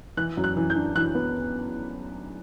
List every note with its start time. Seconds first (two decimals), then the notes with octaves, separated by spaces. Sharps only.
0.17 E3 F#6
0.37 F#2
0.44 F#6
0.57 E3
0.70 G6
0.76 D4
0.95 E3 F#6
1.15 B3